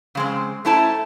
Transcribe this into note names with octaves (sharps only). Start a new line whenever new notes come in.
C#3 G#3 C4
A3 C#4 E4 C5 A5 A#5